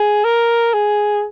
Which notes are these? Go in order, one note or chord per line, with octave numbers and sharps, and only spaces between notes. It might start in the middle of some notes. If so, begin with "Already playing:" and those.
Already playing: G#4
A#4
G#4